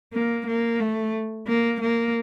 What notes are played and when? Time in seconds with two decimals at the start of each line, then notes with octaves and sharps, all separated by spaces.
0.13 A#3
0.47 A#3
0.80 A3
1.48 A#3
1.81 A#3